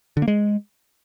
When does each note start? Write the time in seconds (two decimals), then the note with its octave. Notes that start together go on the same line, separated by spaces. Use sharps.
0.17 D3
0.22 A#3
0.28 G#3